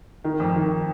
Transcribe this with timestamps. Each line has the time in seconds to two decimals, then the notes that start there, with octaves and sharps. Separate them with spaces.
0.24 D#3
0.40 F2
0.55 D#3